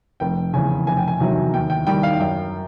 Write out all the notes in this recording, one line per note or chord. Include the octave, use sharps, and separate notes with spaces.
F1 G5
E2 C#3 G#5
F1 G#5
G5
G#5
E2 C3 D#3 F#3
D#2 G5
G5
D#3 G3 G5
F5
F#2 G5